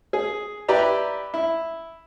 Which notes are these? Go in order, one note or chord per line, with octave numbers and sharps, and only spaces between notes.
G#4
E4 G4 B4 D5 A#5
E4